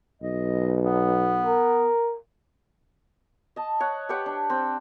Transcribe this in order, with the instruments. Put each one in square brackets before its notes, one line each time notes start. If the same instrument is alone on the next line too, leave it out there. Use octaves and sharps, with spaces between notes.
[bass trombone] B1 [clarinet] D#5
[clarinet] B3
[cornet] A#4
[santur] D#5 A5
C#5 F#5
G4 B4 C#5 F#5
D4
C4